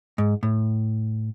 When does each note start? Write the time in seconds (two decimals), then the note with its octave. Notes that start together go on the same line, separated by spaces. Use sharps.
0.18 G#2
0.43 A2